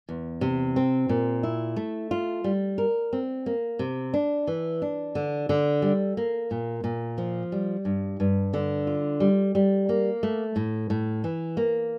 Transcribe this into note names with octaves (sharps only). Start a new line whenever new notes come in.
E2
C3
C4
A#2
E4
A3
F4
G3
A#4
C4
A#3
C3
D4
E3
D4
D3
D3
G3
A#3
A#2
A#2
F3
G3
G2
G2
D3
F4
G3
G3
A#3
A3
A2
A2
E3
A#3